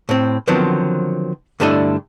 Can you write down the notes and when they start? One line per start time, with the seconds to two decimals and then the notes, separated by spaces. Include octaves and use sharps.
0.09 A2 C4
0.47 D3 D#3 F3 F#3 B3 C4
1.60 G2 D3 A3 D4 E4 D#5